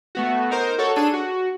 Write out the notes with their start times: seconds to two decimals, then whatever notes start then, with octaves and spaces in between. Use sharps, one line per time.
0.15 A3 B3 F#4
0.51 D#4 A#4 C5
0.78 F#4 A4 C#5
0.96 D4 G#4 A4 D#7
1.14 F#4